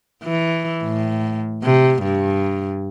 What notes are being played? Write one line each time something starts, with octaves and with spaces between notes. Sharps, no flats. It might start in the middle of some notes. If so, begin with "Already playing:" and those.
E3
A2
C3
G2